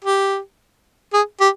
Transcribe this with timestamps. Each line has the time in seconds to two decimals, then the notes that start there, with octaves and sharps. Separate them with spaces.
0.04 G4
1.13 G#4
1.40 G4